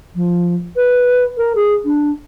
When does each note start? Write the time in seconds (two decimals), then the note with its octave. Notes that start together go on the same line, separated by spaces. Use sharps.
0.15 F3
0.76 B4
1.37 A#4
1.55 G#4
1.85 D4